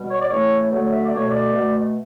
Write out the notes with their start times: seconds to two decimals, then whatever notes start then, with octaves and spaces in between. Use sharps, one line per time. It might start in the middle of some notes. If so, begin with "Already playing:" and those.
Already playing: B2 G3
0.10 C#5
0.20 D5
0.31 C#3 E3 A3 C#5
0.71 D3 F#3 A3 C#5
0.91 E5
1.05 D5
1.12 B2 A3 C#5
1.30 D5
1.53 B2 A3